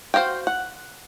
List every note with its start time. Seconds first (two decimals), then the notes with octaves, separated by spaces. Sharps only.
0.14 F#4 C5 D#5 F5 G5
0.47 F#5